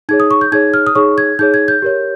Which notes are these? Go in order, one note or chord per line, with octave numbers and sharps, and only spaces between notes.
D#4 G#4 C#5 G#6
D#6
C#6
G6
D#4 G#4 C#5 G#6
F6
D#6
D#4 G#4 C#5 C#6
G#6
D#4 G#4 C#5 G6
G#6
G6
G4 A#4 C#5